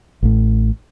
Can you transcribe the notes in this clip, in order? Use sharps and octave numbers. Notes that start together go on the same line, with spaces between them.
A1 A2